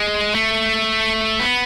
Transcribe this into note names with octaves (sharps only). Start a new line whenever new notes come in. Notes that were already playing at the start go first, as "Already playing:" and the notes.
Already playing: G#3
A3
B3